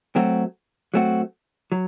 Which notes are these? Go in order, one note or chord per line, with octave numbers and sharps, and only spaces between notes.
F#3 A3 C4 F#4
F#3 A3 C4 F#4
F#3